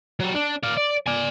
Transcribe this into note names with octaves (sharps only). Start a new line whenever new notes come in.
F#3 G3
D4
D5 F5
D5
D5 G#5